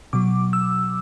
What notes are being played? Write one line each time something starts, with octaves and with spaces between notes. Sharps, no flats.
B2 F#3 D6
E6